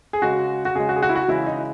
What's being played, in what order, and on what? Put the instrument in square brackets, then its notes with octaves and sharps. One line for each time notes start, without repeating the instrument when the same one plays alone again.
[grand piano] G#4
C#3 G#3 F#4
F#4
C#3 G#3 G#4
F#4
G#4
F#4
E4
F#4
C#3 E3 G#3 E4
D#4